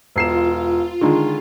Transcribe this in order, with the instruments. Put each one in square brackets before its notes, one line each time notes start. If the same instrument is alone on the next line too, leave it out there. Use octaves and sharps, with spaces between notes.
[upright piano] E1 C7 E7 [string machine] F4
[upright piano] D3 D#3 G#3